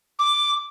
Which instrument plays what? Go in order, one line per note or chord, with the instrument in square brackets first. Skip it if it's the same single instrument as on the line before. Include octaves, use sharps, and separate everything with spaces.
[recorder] D6